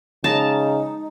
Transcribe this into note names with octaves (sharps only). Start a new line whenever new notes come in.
C#3 G#3 D#4 A5 A#5